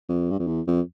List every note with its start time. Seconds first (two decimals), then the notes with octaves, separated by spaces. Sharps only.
0.09 F2
0.31 G2
0.39 F2
0.47 E2
0.67 F2